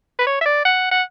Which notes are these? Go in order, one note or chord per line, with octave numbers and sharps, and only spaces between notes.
B4
C#5
E5
D5
F#5
F#5